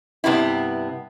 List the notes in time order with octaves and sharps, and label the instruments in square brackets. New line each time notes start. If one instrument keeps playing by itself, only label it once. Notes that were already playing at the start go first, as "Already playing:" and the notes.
[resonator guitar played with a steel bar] G2 C3 B3 E4